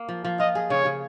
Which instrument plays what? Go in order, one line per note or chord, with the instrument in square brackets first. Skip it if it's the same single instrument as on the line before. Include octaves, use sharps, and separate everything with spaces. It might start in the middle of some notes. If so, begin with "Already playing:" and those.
Already playing: [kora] A#3
F3
F3
[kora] F4 [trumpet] D#5
[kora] G#4
[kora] C#3 [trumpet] C#5
[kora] C#3